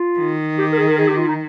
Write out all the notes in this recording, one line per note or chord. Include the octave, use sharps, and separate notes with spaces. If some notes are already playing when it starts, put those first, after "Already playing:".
Already playing: F4
D#3
G4
A#4
G#4
A#4
G#4
G4
F4
D#4